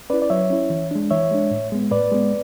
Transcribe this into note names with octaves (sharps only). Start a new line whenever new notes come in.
C#4 E4 B4 D5
D5
F#3 C#5 E5
C#4 E4
E3
G#3 D4
E3 C#5 E5
G#3 D4
A2
G#3 B3
A2 B4 D5
G#3 B3